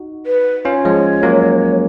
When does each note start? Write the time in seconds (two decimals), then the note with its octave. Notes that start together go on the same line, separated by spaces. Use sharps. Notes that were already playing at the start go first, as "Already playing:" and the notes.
Already playing: D#4 F#4
0.26 B4
0.65 C#4 F4 C#5
0.85 F3 G#3
1.23 F#3 A#3